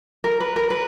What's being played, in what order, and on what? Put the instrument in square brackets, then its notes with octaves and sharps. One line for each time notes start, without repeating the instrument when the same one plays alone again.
[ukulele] A#4
B4
A#4
B4